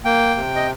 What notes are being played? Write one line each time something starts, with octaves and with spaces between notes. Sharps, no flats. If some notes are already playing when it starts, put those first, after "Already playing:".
A#3 G5
C3
D#5